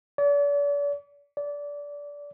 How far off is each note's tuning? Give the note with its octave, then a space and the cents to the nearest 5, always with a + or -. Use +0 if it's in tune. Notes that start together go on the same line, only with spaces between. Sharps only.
D5 -40
D5 -20